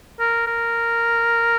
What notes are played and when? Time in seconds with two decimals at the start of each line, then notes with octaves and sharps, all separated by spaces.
0.20 A#4
0.47 A#4